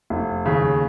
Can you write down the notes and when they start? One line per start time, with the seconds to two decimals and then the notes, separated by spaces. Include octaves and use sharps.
0.10 F1
0.46 D#2 C#3